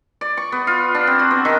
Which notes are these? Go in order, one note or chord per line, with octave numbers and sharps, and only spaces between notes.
D5
C#6
B3
F4
D4
C4
F#4
B3
D#3